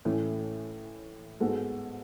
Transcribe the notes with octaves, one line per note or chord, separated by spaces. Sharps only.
A2 E3 A3 C#4 E4
G#2 G#3 B3 F#4 A4